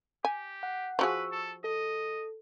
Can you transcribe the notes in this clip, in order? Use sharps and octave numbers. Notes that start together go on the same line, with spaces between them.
G4 G#5
F#5
F3 F#4 G#4 B4 C#6 E6
A4
A4 D#5